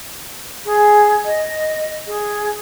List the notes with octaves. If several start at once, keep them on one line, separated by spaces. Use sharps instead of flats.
G#4
D#5
G#4